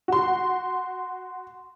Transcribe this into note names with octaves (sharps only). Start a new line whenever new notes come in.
F#4 C6